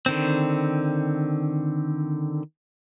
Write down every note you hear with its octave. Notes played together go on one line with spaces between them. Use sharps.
D3 D#3 C4